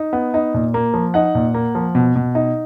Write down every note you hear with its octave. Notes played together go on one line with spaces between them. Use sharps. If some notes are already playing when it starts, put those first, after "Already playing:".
Already playing: D#4
B3
D#4
A#2
A#3
F3
D#4 F#5
A#2
A#3
F3
B2
B2
D#4